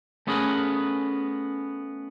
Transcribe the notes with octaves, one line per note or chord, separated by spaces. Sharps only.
A3 B3 C#4 G#4 A#4 B4